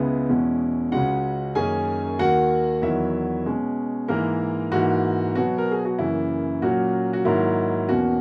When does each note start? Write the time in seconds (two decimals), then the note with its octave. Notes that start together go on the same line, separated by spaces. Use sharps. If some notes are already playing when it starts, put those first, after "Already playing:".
Already playing: C#2 C#3 G#3 B3 E4
0.29 E2 B2 G#3 C#4
0.92 C#2 C#3 G#3 C#4 F#4 F#5
1.55 F#2 D#3 A#3 C#4 G#4 G#5
2.19 D#2 D#3 A#3 F#4 F#5
2.82 E2 D#3 F#3 E4 E5
3.46 B2 G#3 C#4
4.08 G#2 E3 G#3 A#3 A#4
4.72 G#2 E3 A#3 F#4
5.35 B2 F#3 B3 F#4
5.58 A#4
5.72 G#4
5.85 F#4
5.98 F#2 C#3 E3 A#3 E4
6.62 A#2 F#3 A#3 C#4 F#4
7.13 F#4
7.25 G#2 D#3 F#3 A#3 E4
7.88 E2 B2 A#3 C#4 F#4